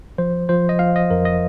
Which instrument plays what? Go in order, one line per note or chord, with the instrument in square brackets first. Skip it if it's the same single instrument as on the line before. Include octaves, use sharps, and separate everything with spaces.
[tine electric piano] F3 C5
F3 C5
D#5
F3 F5
D#5
F2 A#4
D#5